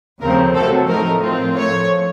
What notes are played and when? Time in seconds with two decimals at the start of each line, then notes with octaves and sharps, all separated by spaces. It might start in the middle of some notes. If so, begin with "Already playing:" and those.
0.21 D#2 C#3 F3 A3 C4 A#4
0.54 C3 F#3 A3 A4
0.88 A2 F3 A3 D#4 A#4
1.21 A2 F3 C4 F4
1.56 A2 F3 A3 C#5